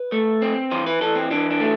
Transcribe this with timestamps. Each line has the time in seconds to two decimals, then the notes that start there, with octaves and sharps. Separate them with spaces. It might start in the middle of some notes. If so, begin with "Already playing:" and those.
Already playing: B4
0.12 A3
0.42 C4
0.71 E3 C5
0.86 B4
1.01 E3 A4
1.16 C4
1.31 E3 D4
1.51 D4
1.60 A3